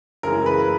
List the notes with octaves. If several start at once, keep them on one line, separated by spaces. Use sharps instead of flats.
F#2 C#3 E3 G#3 A#4
B4